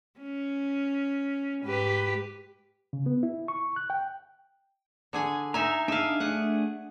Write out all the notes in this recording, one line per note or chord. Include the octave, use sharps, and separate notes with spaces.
C#4
G#2 G4 B4
C#3
B3
E4
C#6
F#6
G5
D3 G#4 G#5
D#4 E5 G#5 A#5
D4 D#4 G#4 E5 F5
A3 D4 G#4 F#5